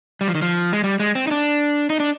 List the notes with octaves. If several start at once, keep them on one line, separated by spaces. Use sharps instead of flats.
G3
F3
D#3
F3
G#3
G3
G#3
C4
D#4
D4
D#4
D4